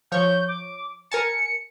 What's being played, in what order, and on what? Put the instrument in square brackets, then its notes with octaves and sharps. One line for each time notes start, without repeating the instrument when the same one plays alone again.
[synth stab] F3 C#5 C#6 [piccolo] G6
[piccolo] D6
[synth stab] A#4 G#5 A5 [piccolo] C#7